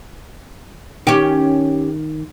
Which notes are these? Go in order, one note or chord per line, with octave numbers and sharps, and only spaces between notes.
D#3 C#4 G4